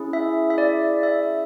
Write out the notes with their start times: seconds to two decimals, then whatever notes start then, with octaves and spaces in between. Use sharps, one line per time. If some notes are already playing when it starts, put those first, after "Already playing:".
Already playing: C#4 E4 G#4
0.13 E5
0.50 E5
0.58 D5
1.03 E5